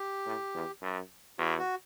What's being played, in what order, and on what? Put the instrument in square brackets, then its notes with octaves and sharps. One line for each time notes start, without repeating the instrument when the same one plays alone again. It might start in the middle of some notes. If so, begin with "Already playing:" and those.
Already playing: [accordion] G4
[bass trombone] A2
E2
F#2
[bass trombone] E2 [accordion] F#4
[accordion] F#4